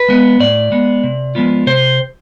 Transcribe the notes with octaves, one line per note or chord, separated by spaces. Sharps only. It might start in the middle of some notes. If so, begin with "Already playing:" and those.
Already playing: B4
G#3 B3
A2 D5
G#3 B3
C3
F3 G#3 B3 F4
C3 C5